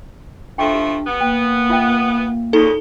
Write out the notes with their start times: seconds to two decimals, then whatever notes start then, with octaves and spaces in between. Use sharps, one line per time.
0.58 F3 A3 D4 G5 C#6
0.74 G4
1.06 B3
1.21 A#3 G5
1.69 F4 E5 G5
2.53 A#2 C#3 D#4 A4